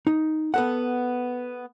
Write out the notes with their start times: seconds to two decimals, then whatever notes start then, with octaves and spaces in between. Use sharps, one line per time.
0.07 D#4
0.54 B3 A4 F#5